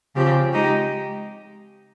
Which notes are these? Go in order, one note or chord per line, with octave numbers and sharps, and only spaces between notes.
C#3 F3 C4 G4
G#3 D#4 G4